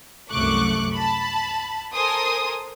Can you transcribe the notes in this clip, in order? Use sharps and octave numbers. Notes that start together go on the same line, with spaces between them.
C2 F#2 A3 C#6 D6 F#6
A5 B5
A4 A#4 C5 G#5 C6 D#6